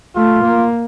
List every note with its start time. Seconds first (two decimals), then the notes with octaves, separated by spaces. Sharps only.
0.16 A3 F4
0.43 A#3